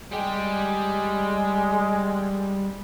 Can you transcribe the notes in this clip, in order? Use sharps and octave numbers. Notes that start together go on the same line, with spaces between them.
G3 G#3 G4